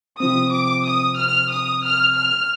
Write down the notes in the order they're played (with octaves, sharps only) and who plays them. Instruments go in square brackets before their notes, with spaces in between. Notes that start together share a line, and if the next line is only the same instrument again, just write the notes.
[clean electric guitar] C3 F3 C4 [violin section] D#6
[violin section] D6
D#6
F6
D#6
F6
F6